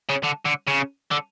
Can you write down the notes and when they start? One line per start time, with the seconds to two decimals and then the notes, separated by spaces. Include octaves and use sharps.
0.09 C#3
0.23 D3
0.45 D3
0.67 C#3
1.11 D3